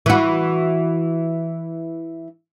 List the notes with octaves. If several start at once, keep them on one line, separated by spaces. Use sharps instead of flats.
E3 F#4